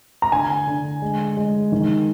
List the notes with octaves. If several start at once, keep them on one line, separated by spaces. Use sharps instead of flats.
A#5
D3 G#5
D3
G#3
G#3
D#3